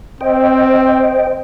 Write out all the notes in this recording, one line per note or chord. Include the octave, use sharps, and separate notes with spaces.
C4 C5 D#5 G5